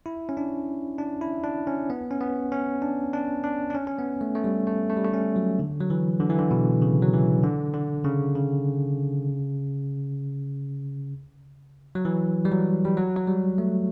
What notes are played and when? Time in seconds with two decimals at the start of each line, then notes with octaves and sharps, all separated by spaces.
0.06 E4
0.29 C#4
0.37 D4
0.98 D4
1.21 E4
1.44 D4
1.67 C#4
1.90 B3
2.11 C#4
2.21 B3
2.52 C#4
2.82 D4
3.13 D4
3.44 D4
3.70 D4
3.75 C#4
3.87 C#4
3.98 B3
4.21 A3
4.35 A3
4.44 G3
4.67 A3
4.89 A3
4.97 G3
5.05 A3
5.14 C#4
5.36 F#3
5.59 D3
5.80 F#3
5.90 E3
6.20 D3
6.29 E3
6.39 D3
6.51 B2
6.82 C#3
7.02 F#3
7.14 E3
7.43 D3
7.74 D3
8.05 C#3
8.36 C#3
11.95 F#3
12.05 E3
12.45 G3
12.52 F#3
12.85 G3
12.97 F#3
13.17 F#3
13.27 G3
13.58 A3